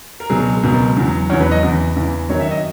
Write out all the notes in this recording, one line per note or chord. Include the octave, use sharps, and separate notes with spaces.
A#4
C#2 B2 F#3 G#4
C#2 B2 F#3 A#4
E2 C#3 F#3
E2 C#3 F#3 C#5
B4
D#5
E2 C#3 E3
E2 C#3 E3
F#2 D#3 F#3 C#5
E5
D#5